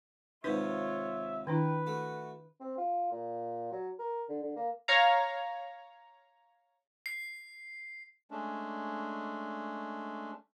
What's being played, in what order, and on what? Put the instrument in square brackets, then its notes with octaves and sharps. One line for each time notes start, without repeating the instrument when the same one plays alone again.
[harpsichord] D#2 G#2 C3 [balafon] D#4 B4 [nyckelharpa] F4 C#5 [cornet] E5
[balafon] D#3 D4 E4 [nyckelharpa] B4 [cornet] G5
[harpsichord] A3 [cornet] F#4
[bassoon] C4
F4
A#2
F#3
A#4
D3
D3
A#3
[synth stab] C#5 F5 A#5
[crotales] C7
[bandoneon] G#3 A3 C#4 D4